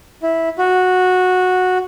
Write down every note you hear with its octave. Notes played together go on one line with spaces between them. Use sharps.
E4
F#4